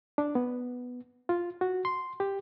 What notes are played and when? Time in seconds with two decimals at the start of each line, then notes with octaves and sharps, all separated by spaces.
0.18 D4
0.35 B3
1.29 F4
1.61 F#4
1.85 C6
2.20 G4